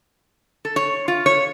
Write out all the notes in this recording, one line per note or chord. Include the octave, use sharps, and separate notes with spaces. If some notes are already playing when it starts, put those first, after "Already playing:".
A4
C#5
F4
C#5